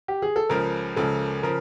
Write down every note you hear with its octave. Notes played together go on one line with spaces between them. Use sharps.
G4
G#4
A4
C#2 C#3 F3 A#4
C#2 C#3 F3 A4
C#3 F3 A#4